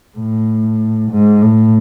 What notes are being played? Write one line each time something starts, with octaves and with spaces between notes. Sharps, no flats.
A2
G#2
A2